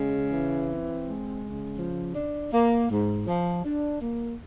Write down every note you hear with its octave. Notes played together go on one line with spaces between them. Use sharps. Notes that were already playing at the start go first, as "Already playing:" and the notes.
Already playing: C#3 G#3
E3
C4
G#3
C#3
F3
D4
A#3
G#2
F3
D4
A#3